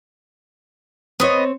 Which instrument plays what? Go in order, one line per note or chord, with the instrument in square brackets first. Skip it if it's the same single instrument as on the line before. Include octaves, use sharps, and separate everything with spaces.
[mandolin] B3 D#5 [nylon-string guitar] C4 C#5